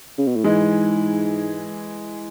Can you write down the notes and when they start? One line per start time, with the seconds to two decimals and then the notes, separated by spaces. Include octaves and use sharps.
0.18 C#3
0.27 B2
0.36 A2
0.44 G#2 E3 G#3